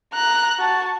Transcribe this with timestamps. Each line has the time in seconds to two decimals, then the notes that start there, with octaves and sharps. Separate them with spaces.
0.14 A#5 F#6
0.59 F#4 A5